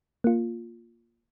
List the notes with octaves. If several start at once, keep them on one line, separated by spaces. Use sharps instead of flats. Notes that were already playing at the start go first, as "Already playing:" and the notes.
A#3 F4